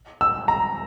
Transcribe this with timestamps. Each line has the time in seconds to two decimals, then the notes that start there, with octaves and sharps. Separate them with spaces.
0.21 E6
0.48 A#5